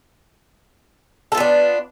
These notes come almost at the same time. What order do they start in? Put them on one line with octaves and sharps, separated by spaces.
A4 F4 B3 D4